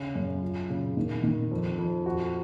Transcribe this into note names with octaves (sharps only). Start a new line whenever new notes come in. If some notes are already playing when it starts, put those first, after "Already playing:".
Already playing: C#3 C#4
F#2
F4
C#3
D#3
D#3
F2
F2
F#4